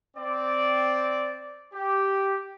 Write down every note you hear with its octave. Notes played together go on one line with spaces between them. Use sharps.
C4 D5
G4